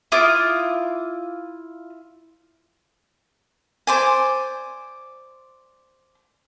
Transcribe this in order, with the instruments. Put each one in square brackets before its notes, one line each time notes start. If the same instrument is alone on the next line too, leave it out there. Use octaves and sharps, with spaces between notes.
[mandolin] E4 F4 D6 D#6
[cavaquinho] C5 D5 G#5